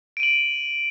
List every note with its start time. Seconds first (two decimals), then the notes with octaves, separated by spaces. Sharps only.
0.17 D7
0.20 D#7
0.23 F#7